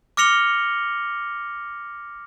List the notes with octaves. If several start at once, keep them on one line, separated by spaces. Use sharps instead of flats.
D6 F6 A#6 C#7 F7 G7